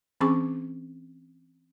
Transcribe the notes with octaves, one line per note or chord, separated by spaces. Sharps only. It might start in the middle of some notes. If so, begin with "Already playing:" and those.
E3 C4 C#4 G#4 C#6 D6